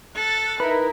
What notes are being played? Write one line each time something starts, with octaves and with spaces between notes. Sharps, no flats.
A4 F#6 A6
D#4 E4 A#4 B4